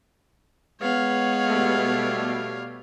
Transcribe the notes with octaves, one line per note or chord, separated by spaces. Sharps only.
G#3 B3 C#5 F5
B2 G3 A3